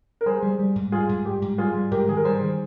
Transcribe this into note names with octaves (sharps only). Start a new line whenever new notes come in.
A#4
G3 G#4 C5
G3
G3
G#2
G3 F4 G#4
G#2
G3 G4
G#2
G3 F4 G#4
G3
G#2 G4 A#4
D#3 G#4
A#4
G3 G#4 C5
D#3